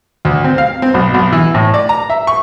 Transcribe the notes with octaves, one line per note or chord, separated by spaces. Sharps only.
D2
C4
F5
C4
B1
B1
E3
A2
D5
A#5
E5
C#6